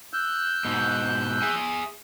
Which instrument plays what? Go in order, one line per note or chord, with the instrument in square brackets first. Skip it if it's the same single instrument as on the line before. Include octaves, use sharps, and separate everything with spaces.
[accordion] E6 F#6 G6
[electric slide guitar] G#2 B2
G#4 E5 G#5